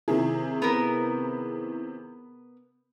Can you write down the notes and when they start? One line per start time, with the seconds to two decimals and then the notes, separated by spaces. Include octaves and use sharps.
0.08 C3 D#3 E4 G#4
0.62 B3 A#4